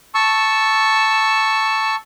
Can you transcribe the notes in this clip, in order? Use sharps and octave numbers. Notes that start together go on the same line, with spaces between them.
A5 C#6 E6